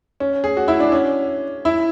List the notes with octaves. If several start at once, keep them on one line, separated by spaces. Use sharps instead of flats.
C#4
G#4
F#4
E4
D4
C#4
E4